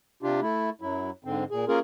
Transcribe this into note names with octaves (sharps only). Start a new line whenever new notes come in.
C3 D4 F4 G4
A3 E4
F#2 F#3 E4
G#2 D3 C4
A#2 G#4
A#3 C#4 F4 G#4 A#4